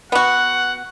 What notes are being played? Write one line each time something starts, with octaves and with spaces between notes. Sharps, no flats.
B3 F#4 F#5